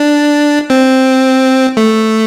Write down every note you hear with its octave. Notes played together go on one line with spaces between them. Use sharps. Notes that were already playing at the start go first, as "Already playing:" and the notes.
Already playing: D4
C4
A3